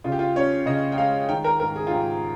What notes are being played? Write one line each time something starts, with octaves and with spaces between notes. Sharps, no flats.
C#3 F4
G4
F4
C#4 C#5
C#3 D#5
G5
G#3 F5
D#3 G5
A#4
G#2 A#4
G#4
F4
G#2 G4